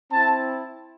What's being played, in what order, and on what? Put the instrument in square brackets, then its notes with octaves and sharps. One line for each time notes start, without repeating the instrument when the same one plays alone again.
[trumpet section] C4 E4 A5